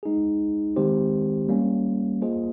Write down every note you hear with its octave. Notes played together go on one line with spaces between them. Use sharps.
G#3 D#4 G#4
D#3 G#3 C4 G4 C5
G3 A#3 C#4
A#3 F4 G#4 C5 D#5